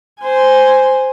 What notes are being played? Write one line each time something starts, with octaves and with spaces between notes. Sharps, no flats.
C5 G#5